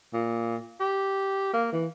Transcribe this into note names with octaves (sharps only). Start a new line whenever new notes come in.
A#2
G4
A#3
E3